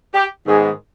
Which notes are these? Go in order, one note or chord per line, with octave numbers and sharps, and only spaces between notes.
G4
G#2 D#3 G#3 B3 G#4